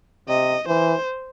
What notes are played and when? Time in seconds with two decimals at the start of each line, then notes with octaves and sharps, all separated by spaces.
0.29 C3 D#5
0.67 E3 C5